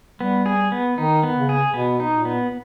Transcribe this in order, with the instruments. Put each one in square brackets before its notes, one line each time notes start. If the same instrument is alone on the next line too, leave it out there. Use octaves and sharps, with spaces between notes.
[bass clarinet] G3 [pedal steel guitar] B3
[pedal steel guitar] G#4
B3
[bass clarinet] D#3 [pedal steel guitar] D#4
[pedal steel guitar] B3
[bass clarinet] C#3
[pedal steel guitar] G#4
[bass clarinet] B2 [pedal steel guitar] B3
[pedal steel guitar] D#4
[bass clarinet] A#2
[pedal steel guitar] B3